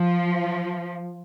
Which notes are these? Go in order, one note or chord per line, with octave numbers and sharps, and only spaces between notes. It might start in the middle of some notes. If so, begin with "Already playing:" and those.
Already playing: F3